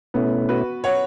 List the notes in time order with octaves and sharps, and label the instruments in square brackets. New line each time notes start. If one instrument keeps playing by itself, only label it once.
[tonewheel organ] B2 A3 C#4 E4 [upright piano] B3
[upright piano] F#4 B4
C#5 F#5